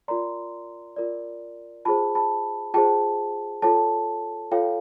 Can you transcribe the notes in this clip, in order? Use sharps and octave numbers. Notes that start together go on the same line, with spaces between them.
F4 A#4 D5 A#5 C6
F4 A#4 D5
F4 G#4 C5 A5 B5
A5 B5
F4 G#4 C5 G5 A5
F4 A4 C#5 G5 A5
F4 A4 C#5 F5 G5